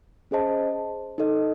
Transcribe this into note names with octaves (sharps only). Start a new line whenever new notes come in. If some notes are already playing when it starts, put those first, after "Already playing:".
C#4 G#4 C5 D#5 A5
D#4 A4 D#5